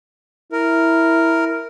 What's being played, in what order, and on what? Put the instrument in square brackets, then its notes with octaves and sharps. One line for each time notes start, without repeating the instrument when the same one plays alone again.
[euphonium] E4 [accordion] A#4